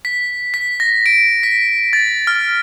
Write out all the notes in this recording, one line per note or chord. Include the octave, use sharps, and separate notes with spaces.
B6
B6
A#6
D7
B6
A6
F6